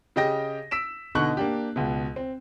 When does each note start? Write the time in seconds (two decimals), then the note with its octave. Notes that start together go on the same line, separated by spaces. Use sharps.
0.16 C#3 G4 D#5 G5 A#6
0.71 E6 B6 D7 E7
1.15 B2 D3 D#4 D#5 C#6 F#6
1.37 A#3 D4 G4
1.76 C#2 B2
2.16 C4